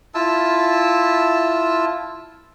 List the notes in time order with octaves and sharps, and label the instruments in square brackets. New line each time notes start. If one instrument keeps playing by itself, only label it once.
[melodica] E4 F4 A5 E6